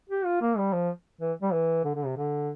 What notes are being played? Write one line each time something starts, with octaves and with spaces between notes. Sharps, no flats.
G4
F4
A#3
G3
F3
E3
G3
E3
D3
D3
C3
D3